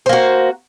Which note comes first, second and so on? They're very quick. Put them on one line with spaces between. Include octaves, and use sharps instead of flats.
C5 A#3 F#4